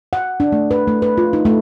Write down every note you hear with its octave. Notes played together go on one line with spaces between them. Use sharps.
F#5
D4
A3
B4
A3
B4
F4
D#4
A3